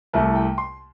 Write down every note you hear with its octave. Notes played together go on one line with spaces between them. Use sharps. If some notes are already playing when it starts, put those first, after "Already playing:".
C2 C3 A3 E4 A5
G5
C6